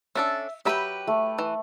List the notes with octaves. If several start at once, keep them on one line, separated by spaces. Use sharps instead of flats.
C#4 D4 A4 E5
F#3 G4 B4 E5 G5 B5
A3
E3